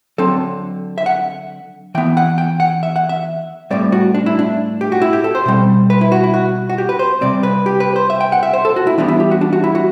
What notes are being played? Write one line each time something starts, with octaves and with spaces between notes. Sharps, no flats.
D3 F#3 C4 A4
E5
F#5
E3 B3 G5
F#5
G5
F#5
E5
F#5
E5
A2 G3 C4 D5
F#4
D4
E4
D4
G4
F#4
E4
G4
A4
C5
B2 G3 C4
B4
E4
F#4
E4
F#4
F#4
G4
B4
C5
C3 G3 C4 D5
B4
G4
B4
C5
E5
G5
F#5
E5
C5
A4
F#4
E4
E3 G3 B3 D4
E4
G4
F#4
D4
F#4
E4
F#4